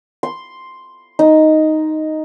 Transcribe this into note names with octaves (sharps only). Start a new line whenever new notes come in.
C6
D#4